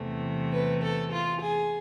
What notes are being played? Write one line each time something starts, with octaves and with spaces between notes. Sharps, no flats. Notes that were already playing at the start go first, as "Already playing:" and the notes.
Already playing: E2 C3 E3 A3
B4
A4
F4
G#4